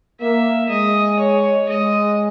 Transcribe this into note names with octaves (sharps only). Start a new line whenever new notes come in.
A#3 E5
G#3 D#5
C#5
G#3 D#5